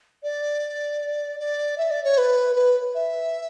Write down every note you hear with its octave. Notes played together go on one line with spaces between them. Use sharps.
D5
D5
E5
D5
C#5
B4
B4
E5